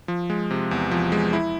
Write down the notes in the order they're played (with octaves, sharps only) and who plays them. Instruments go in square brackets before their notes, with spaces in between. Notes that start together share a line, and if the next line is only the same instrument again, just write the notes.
[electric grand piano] F3
G#3
C3
E2
F3
G#3
E4